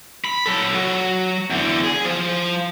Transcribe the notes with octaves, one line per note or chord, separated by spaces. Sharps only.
B5
F#3 A4
F#3
E2 D3
G#4
F3